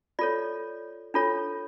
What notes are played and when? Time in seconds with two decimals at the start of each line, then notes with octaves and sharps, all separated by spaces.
0.19 F4 A4 C#5 D5
1.14 D4 F4 A4 C#5